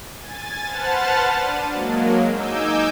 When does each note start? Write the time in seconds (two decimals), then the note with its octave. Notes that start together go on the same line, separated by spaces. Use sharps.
0.16 G#5 A6
0.64 B4 C5 F#5 A5 F6 A6
1.36 D4 D#7
1.68 F#3 G#3 A#3
2.30 D#4 G#5 D6 E6 G6